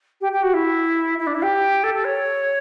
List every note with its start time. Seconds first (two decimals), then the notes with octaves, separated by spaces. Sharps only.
0.21 G4
0.32 G4
0.42 F#4
0.53 E4
1.18 E4
1.26 D4
1.34 E4
1.42 G4
1.83 A4
1.94 A4
2.04 C#5